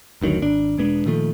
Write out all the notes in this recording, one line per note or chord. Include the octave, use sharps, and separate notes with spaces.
F#1 D2 D#3 F#3
G#1 D4
E1 G#3 B3 D4
A#2 D#3 F3 A3